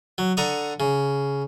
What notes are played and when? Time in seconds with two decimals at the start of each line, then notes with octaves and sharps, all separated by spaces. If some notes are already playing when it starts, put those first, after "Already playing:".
0.18 F#3
0.37 D3 A#5 C#6 D#6
0.80 C#3